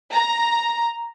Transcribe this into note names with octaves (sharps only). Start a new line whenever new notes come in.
A#5